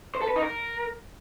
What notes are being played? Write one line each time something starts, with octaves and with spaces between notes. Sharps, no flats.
C5
A4
B4
D#4
A#4